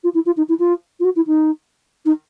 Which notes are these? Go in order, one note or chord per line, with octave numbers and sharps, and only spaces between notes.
F4
E4
F4
D#4
E4
F4
F4
F#4
E4
D#4
D#4